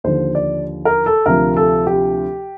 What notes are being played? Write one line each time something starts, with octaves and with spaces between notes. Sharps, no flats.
D#2 D3 F3 C5
D5
A#4
A4
D2 C3 F3 A#4
A4
G4